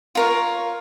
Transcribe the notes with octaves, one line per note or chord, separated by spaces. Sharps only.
F4 A#4 C#5